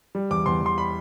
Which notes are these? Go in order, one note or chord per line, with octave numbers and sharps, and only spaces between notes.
G3
E2 D6
E2 C6
E2 C6
B5